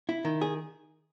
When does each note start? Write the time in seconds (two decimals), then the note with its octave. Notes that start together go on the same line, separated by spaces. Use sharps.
0.09 E4
0.25 D#3
0.41 G#4